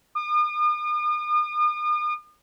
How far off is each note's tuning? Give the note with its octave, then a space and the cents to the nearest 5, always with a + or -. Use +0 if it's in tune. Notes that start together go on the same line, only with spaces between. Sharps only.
D#6 -45